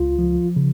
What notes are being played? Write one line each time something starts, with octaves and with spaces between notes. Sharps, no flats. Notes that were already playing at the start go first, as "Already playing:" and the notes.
Already playing: C#2 F4
F3
C#3